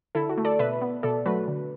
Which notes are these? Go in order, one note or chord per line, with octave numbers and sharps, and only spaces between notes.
D3 E4 A4
F#4
A3
A4 D5
B2 B4 E5
B3
B2 A4 D5
F#3 A3 F#4 B4
D3